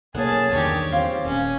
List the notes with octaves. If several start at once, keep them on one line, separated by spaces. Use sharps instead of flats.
B1 A#3 C#4 G#4 F#5 A5
E2 G2 D#3 G4 C#5
C4 F4 G4 C#5
D#1 C#4